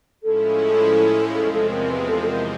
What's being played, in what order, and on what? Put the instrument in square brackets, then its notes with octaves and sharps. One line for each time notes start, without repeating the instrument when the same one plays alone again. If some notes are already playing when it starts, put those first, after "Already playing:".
[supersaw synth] A2 F3 G#3 C#4 E4 [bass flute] A4
[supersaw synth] E2 C3 F3 G#3 C4 [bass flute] A4
[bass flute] A4
A#4
B4
A4
A4
A#4